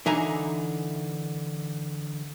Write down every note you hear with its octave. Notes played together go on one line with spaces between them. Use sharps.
D3 E3 D#4 E5 G#5 A#5